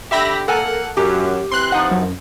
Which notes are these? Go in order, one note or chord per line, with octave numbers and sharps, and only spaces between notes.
D3 G4 E5 B5 A#6
A#3 A4 A#4 F#5 G#5
F#2 G4
E3 B3 C4 C6 F#6
F3 D#4 F#5
F#2